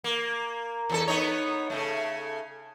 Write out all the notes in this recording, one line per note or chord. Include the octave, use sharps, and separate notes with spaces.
A#3
E2 C4 A4
B3 D#4 C#5
C#3 A3